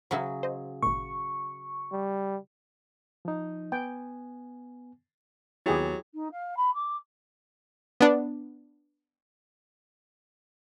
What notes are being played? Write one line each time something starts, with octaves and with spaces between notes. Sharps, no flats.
C#3 F#3 E5 F#5 B5
C5 D#5
G#1 A#2 C#6
G3
F3 D#4
B3 G5 G#5
D#2 F#3 B3 E4 G4 G#4 A6
D#4
F5
B5
D6
B3 D4